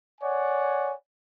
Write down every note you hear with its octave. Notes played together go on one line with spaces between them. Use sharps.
C#5 D5 F#5 G#5